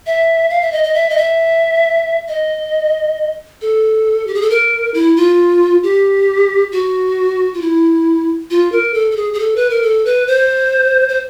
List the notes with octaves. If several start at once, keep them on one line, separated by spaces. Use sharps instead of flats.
E5
F5
E5
D#5
D#5
E5
D#5
E5
D#5
A4
G4
G#4
A4
A#4
E4
F4
G4
F#4
F4
E4
F4
A#4
A4
A4
G#4
G#4
A4
B4
A#4
A4
B4
C5
C5